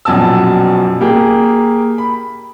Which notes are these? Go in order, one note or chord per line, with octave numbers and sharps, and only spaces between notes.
A#1 F#2 B2 G#5 A5 E6
A#3 G4 G#4
B5